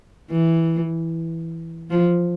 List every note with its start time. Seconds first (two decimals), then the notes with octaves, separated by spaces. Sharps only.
0.31 E3
1.91 F3